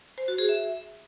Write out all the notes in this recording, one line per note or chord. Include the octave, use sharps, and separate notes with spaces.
C5
F#4
G#4
E5